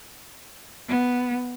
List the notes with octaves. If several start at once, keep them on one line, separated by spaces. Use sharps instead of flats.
B3